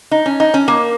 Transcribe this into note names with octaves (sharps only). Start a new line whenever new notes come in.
D#4
C#4
D#4
C#4
A#3